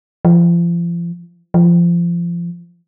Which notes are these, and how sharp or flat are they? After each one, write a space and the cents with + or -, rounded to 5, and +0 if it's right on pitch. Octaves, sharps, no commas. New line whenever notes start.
F3 -35
F3 -25